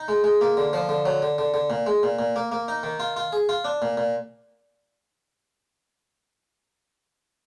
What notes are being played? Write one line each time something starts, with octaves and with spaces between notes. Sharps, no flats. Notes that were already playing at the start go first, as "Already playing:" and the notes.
Already playing: D#4
G#3
G#3
A#3
D3
F3
D3
F#3
D3
D3
D3
A#2
G#3
A#2
A#2
A#3
A#3
D#4
D#3
F4
F4
G#4
F4
D4
A#2
A#2